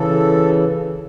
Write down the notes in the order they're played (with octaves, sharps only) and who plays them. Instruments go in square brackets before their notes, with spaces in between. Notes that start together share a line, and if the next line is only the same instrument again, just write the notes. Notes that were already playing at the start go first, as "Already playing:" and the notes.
Already playing: [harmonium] C#3 E3 A4